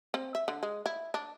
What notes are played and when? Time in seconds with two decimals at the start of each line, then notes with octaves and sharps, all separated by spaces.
0.14 C4
0.35 E5
0.48 D3
0.63 G#3
0.86 E4
1.14 D4